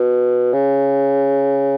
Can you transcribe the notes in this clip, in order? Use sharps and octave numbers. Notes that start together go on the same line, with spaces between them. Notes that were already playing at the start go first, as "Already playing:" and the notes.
Already playing: B2
C#3